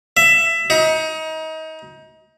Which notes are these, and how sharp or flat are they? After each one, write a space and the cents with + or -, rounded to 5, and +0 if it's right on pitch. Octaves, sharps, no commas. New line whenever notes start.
E5 +15
D#4 +30